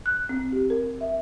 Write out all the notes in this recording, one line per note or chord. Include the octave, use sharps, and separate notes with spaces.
F#6
C4
G4
A#4
E5